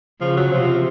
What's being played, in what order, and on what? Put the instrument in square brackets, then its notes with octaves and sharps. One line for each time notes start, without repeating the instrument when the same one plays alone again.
[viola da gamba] C#3 [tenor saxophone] F3
[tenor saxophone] F#3
[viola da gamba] C3 [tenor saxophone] F3
[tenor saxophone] F3